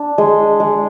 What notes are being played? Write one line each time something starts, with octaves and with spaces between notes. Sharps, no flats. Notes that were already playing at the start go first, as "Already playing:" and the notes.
Already playing: D4
G#3
G#3